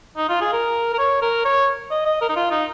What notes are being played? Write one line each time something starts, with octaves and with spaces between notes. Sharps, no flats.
D#4
F4
G#4
A#4
A#4
C#5
A#4
C#5
D#5
D#5
A#4
D#4
F4
D#4